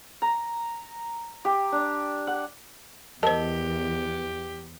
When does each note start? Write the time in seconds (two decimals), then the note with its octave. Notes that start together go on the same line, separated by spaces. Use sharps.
0.22 A#5
1.45 G4
1.72 D4
2.27 F#5
3.23 E2 G4 A#4 C5 D#5 A5 E6